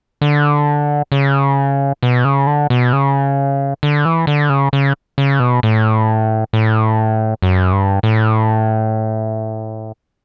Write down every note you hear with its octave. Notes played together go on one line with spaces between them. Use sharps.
D3
C#3
B2
C#3
D3
B2
C#3
D3
E3
D3
C#3
C#3
C#3
B2
A2
A2
F#2
G2
A2